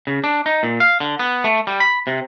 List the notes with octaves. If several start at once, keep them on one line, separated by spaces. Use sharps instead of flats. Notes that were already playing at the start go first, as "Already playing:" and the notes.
C#3
D4
D#4
A#2
F5
D3
B3
A3
G3
B5
C3